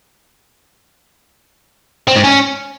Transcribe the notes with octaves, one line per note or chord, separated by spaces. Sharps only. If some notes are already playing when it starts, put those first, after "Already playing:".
C4
G#2
C#4